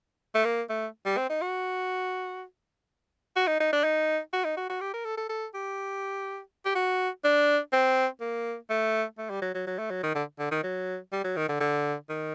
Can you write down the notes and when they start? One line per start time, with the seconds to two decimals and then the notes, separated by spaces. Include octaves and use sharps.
0.35 A3
0.45 A#3
0.69 A3
1.06 G3
1.17 C4
1.30 D#4
1.41 F#4
3.36 F#4
3.47 D#4
3.60 D#4
3.73 D4
3.84 D#4
4.33 F#4
4.44 D#4
4.57 F#4
4.70 F#4
4.81 G4
4.94 A#4
5.05 A4
5.17 A4
5.29 A4
5.54 G4
6.65 G4
6.75 F#4
7.24 D4
7.73 C4
8.21 A#3
8.70 A3
9.18 A3
9.30 G3
9.42 F#3
9.54 F#3
9.67 F#3
9.79 A3
9.90 F#3
10.03 D#3
10.15 D3
10.39 D3
10.51 D#3
10.63 F#3
11.12 G3
11.24 F#3
11.36 D#3
11.49 D3
11.60 D3
12.09 D#3